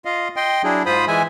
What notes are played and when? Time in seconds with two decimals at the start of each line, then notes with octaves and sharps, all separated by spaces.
0.05 F4 D#5 F5
0.36 D#5 G5 C6
0.64 F#3 D4 E4 G#4
0.86 G#2 F4 C5 B5 D#6
1.08 E3 G#3 E5 G#5